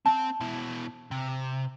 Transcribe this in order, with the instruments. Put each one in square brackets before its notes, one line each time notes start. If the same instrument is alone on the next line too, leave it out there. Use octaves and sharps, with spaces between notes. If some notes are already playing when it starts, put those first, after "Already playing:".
[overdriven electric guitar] C4 G5 [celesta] A5
[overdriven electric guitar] B2 E4
C3